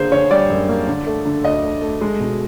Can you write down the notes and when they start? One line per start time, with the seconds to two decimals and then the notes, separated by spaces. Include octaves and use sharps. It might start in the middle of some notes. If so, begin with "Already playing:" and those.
Already playing: D3 A#3 G#4 C5
0.12 D3 C#5
0.31 G3 D5
0.50 F#2
0.69 A#3
0.88 D3
1.06 A3
1.25 D3
1.44 D2 D#5
1.63 A3
1.82 A3
2.01 G#3
2.20 B2